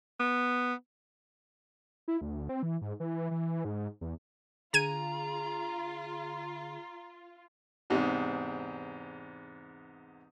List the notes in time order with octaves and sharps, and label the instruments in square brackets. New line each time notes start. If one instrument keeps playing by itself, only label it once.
[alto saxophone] B3
[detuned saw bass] E4
D2
C4
E3
G#2
E3
E3
G#2
E2
[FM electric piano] D3 G#4 [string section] F4 [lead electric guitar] A#5 [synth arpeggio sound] G#6 D#7
[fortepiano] E2 G#2 C3